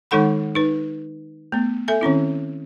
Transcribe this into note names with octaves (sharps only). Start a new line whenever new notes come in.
D#3 G#3 D#4 A4 F#5 B5
D#4 B4
A3 B3
A4 E5 G#5
D#3 C4 C#4 E4